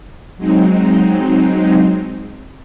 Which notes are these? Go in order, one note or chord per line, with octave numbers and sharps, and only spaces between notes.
F#3 G#3 C4 D#4